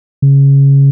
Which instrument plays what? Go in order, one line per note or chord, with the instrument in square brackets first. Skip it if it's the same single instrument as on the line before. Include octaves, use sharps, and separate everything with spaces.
[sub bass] C#3